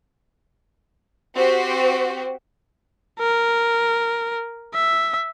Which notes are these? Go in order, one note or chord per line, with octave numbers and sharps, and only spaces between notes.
C4 F#4 G4 C5
A#4
E5